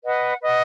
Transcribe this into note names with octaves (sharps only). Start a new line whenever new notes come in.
B4 D#5 F#5
B4 D#5 F#5